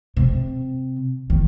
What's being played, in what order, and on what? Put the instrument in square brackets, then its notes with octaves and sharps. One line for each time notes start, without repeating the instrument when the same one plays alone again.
[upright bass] C3
D#3